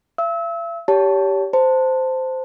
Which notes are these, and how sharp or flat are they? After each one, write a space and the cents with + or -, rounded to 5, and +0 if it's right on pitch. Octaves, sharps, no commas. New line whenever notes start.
E5 +45 E6 -30
G4 +0 C#5 +30 A5 +0
C5 -10 A5 +15